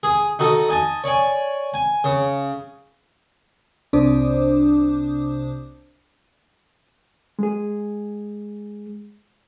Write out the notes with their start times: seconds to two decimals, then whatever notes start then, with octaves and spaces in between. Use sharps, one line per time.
0.03 G#4
0.39 D#4 F#4 A4 D#5 A5
0.69 D#5 G#5 A5
1.04 C#5 D5 G#5
1.74 G#5
2.04 C#3
3.93 C2 C3 D4 C5 D6 D#6
7.39 G#3 G#4